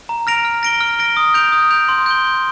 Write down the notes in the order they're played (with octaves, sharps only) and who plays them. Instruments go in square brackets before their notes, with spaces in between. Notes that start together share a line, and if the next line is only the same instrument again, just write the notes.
[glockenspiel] A#5
F6 A#6 D7 F7
F6
A#6 D7 G7
F6
A#6 D7 G7
D#6
G6 D7 F7
D#6
G6 D7 F7
C6
G6 D7 G7
C6